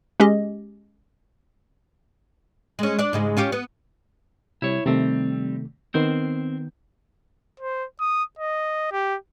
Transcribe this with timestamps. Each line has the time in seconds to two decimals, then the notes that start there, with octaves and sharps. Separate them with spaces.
0.20 G#3 C#4 G4 G#4 D#5
2.79 G#3 C#4
2.99 D4 D5
3.13 G#2 C#3 G#3
3.37 C#4 F4 G4
3.52 B3
4.62 C3 G3 E4 C#5
4.86 C3 D#3 G3 A3 C4
5.94 D#3 B3 C4 A#4 C5 G6
7.60 C5
8.00 D#6
8.39 D#5
8.92 G4